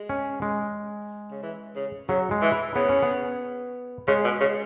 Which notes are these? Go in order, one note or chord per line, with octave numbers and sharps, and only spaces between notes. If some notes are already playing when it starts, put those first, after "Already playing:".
Already playing: G#3
C#4
G#3
C#3
E3
C#3
C#3 F#3
G#3
E3
E4
C#3 B3
C#4
B3
C#3 G#3
B2
C#3